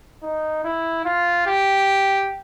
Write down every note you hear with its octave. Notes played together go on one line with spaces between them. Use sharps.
D#4
E4
F4
G4